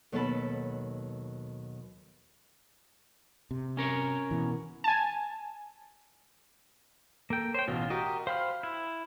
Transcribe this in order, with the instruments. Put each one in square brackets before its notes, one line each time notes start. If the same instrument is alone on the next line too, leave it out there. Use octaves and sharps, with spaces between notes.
[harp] D#2 B2 F#3 A4 A5 B5
[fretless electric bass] C3
[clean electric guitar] C#4 A#4 C#5
[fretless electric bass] B2 E3
[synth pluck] G#5 A5
[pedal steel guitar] A#3 G5 [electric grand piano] A4
[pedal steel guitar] C5 G5 [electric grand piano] C#5
[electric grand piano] A1 B2 [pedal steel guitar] F4
[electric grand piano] F#4 [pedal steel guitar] G4 A#4 D#5
[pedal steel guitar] C5 B5 F6 [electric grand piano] F5 G5
[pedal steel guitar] E4